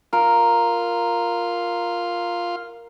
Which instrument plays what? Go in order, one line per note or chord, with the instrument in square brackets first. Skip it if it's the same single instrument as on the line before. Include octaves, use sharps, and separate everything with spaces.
[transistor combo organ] F4 F5 [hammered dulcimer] A#4